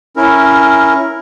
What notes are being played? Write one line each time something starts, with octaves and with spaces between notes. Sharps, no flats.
C#4 E4 A#4